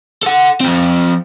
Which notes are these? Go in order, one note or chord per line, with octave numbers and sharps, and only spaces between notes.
A4 F#5
F3 C4